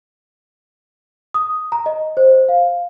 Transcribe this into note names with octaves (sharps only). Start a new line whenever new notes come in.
D#6
A#5
D#5
C5
F5